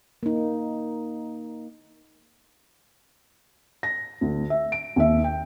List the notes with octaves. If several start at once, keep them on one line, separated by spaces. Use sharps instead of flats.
A#3 D#4
A#6
D2
E5
D7
D#2 E5
G5